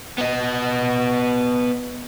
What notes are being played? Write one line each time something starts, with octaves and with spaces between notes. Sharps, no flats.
B3 D#5